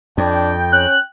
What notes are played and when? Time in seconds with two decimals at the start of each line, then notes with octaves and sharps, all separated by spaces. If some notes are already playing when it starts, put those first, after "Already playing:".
0.18 F2 D4 G5
0.72 C#4 F#6